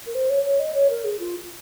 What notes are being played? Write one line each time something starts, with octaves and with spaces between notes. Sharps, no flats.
A#4
C5
C#5
C#5
D#5
C#5
A#4
G#4
F4